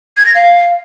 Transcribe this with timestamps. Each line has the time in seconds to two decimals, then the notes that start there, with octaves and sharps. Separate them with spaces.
0.17 G#6
0.25 A#6
0.34 F5